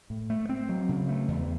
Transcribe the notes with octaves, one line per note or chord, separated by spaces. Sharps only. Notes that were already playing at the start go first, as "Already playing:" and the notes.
A2
A3
C4
F#3
C#3
A3
E2